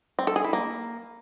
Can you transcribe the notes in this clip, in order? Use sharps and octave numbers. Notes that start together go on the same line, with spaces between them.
C4
A4
G#4
E4
A#3